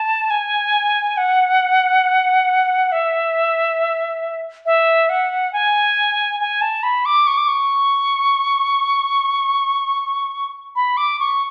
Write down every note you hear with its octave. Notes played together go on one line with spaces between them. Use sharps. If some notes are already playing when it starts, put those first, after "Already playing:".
Already playing: A5
G#5
F#5
E5
E5
F#5
G#5
G#5
A5
B5
D6
C#6
D6
C#6
B5
D6
C#6